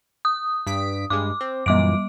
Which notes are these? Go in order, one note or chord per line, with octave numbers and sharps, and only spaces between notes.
D#6
G2 B6 D7
G2 G3 G#3 D6
C4
F#2 A#2 E3 G3 D6 D7